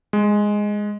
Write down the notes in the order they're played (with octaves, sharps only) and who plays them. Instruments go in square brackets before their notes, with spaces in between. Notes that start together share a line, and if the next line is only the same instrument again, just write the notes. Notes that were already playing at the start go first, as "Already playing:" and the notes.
[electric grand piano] G#3